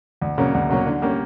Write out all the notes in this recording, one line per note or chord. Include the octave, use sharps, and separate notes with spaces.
D2
C#3 F#3 A#3 C#4
D2
C#3 F#3 A#3 C#4
D3
G3 A#3 C#4